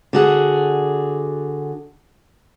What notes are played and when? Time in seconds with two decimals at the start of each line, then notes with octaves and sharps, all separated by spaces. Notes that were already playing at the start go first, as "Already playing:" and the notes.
0.13 D3 F#4 G#4